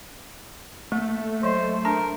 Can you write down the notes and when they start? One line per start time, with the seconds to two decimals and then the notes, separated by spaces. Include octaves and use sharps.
0.92 A3 A#3
1.43 F#3 C5 D#5
1.85 D4 A#4 A5